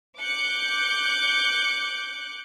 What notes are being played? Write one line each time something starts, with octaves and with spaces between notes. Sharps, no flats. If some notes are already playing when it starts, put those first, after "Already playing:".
D6 F#6 G6 C#7